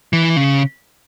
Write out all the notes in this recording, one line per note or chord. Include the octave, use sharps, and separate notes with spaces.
E3
C#3